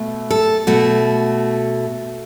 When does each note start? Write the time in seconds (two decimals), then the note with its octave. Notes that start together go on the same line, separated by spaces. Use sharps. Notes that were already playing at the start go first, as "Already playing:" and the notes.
Already playing: B2 A3
0.31 A4
0.67 B2 A3 F#4